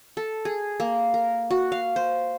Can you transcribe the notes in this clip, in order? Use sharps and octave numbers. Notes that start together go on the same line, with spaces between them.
A4
G#4
A#3
A#4
F#4
F5
C5